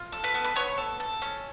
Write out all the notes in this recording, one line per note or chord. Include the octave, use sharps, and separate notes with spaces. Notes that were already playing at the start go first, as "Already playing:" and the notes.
Already playing: F4
A4
B4
B3
B4
B3 C#5
A4
A4
C#4